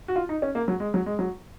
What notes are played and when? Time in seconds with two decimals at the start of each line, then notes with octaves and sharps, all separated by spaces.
0.08 F#4
0.16 F4
0.29 D#4
0.42 C#4
0.55 A#3
0.68 F#3
0.80 G#3
0.94 F#3
1.06 G#3
1.19 F#3